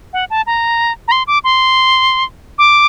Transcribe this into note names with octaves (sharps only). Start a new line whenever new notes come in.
F#5
A5
A#5
A#5
C6
D6
C6
D6